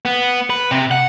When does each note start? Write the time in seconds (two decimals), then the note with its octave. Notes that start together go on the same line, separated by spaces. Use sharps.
0.05 B3
0.50 B4
0.71 C3
0.91 F#5